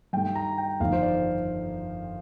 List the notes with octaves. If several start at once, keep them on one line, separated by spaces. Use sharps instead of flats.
G2 D#3 A3 G5
A#5
G5
G1 F2 D#3 A3 F5
C5
D5